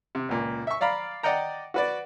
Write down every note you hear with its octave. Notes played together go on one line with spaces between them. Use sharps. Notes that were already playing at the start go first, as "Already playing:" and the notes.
C3
C#2 A#2
E5 C#6
D5 F5 A#5 B5
D5 D#5 F#5 G5 A#5
F#4 B4 D5